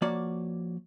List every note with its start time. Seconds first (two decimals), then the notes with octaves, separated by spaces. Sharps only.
0.02 F3 A#3 F#4 C#5 D5